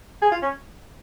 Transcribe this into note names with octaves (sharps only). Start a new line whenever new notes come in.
G#4
F4
C#4